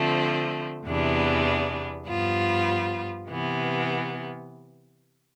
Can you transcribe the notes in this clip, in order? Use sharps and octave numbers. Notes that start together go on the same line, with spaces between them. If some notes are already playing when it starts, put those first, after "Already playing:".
Already playing: D3 F3 A3 C4
E2 C3 E3 B3 D4
G2 F3 B3 F4
C3 E3 B3